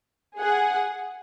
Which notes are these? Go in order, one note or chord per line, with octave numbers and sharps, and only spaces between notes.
G#4 F#5